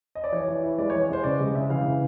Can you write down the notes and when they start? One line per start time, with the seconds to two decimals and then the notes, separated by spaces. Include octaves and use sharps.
0.15 D#5
0.24 D5
0.32 E3 C#5
0.48 E3
0.63 E4
0.78 G#3 D5
0.90 C#5
0.94 E3
1.09 G#3 C5
1.24 C#3 D5
1.39 G#3 D#5
1.55 C#3 E5
1.70 E3 F5
1.85 C#3